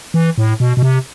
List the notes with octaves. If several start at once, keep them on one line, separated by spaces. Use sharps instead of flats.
E3
A2
B2
B2
C3